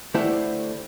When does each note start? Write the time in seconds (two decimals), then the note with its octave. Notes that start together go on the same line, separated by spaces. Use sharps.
0.14 D3 A3 E4 G4 C5 F#5